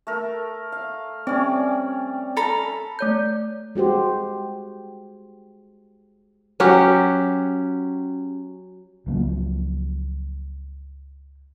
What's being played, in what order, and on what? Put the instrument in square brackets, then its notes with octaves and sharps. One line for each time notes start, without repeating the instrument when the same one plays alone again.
[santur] A3 A#4
F5
[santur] G3 C#4 D5 [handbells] C4
[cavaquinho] A4 A#5 B5
[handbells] A3 C#5 G6
[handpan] G#3 F#4 G4 C5
[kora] F#3 C#4 F#4 G4
[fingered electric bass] C#2 F3 F#3 A#3